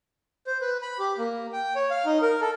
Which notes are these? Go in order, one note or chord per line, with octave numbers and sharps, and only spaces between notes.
C5
B4
B5
G4
A#3
G5
C#5
F5
D#4
A#4
A4